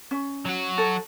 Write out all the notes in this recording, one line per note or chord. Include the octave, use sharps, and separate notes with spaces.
C#4
F#3 F#4
A4